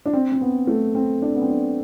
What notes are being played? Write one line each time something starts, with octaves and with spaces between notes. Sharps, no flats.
D4
C4
C4
B3
A3
C4
D4
B3
C4
D4